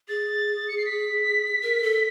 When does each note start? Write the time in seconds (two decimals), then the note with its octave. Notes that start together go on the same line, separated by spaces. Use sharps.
0.09 G#4 A6
0.68 C#7
0.77 C7
0.85 B6
1.63 A#4
1.82 A4